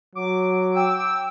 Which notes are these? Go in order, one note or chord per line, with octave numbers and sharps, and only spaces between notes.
F#3 D6
G5 E6